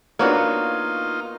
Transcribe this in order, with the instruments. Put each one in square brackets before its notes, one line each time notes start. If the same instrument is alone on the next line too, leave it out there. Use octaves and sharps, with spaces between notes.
[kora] A#3 B3 F#4 [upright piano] D4 C#5 [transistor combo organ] D#4 F4